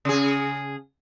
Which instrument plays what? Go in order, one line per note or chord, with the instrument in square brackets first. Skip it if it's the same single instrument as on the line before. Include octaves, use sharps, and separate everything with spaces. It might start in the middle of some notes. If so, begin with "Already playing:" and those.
[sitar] C#3 G#4